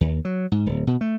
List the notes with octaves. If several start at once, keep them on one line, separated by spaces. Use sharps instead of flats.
D#2
F#3
G#2
D1
B2
A3